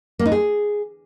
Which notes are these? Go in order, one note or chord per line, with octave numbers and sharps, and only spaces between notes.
A#3
D#4
G#4